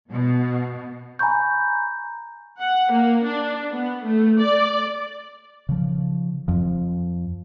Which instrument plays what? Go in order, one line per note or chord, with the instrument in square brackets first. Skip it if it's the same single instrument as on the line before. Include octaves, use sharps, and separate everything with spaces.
[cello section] B2
[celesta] G#5 A#5 B5 C#6 G6
[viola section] F#5
A#3
D4
B3
A3
D5
[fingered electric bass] C#3 F3
F2 F3